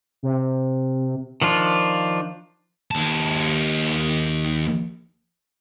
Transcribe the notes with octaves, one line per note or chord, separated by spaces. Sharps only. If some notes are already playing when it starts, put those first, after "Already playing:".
C3
D#3 F3 D4 F4
D#2 A5